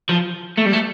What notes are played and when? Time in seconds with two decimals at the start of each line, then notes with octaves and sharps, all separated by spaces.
0.09 F3
0.58 A3
0.66 G3
0.73 A3